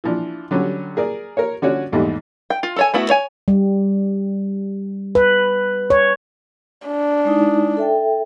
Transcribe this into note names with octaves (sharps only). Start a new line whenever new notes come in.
E3 F3 D4
D3 F#3 G3 C#4
G#4 A#4 D5
A#4 C#5
D3 C#4 F#4 C#5 D5
A#1 E2 G#2 G3 A3 D#5
G5
F4
A4 C#5 G#5
A3 B3 E4 F#4
C#5 G#5
G3
B4
C#5
D4
G#3 D#4 E4
A4 E5 G5